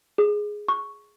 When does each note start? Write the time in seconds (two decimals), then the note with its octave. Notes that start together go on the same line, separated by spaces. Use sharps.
0.18 G#4
0.68 C#6